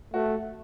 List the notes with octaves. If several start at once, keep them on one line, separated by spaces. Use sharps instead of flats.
A3 F#4